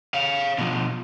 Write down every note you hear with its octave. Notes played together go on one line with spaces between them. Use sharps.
C#5 F5
B2 F3